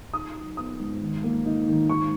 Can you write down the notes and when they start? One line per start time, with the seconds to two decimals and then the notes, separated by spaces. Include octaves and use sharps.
0.13 D#4 D#6
0.36 F#3
0.57 B3 D#6
0.80 G#2
1.01 D#3
1.23 A#3
1.46 D#4
1.68 D#3
1.89 G#2 C#6